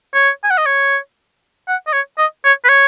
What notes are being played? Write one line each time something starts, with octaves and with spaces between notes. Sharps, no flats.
C#5
G#5
F#5
D#5
C#5
F#5
D#5
C#5
D#5
C#5
B4
C#5